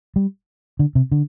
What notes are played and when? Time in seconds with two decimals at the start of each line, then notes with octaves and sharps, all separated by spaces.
0.16 G3
0.79 D3
0.95 C3
1.12 D3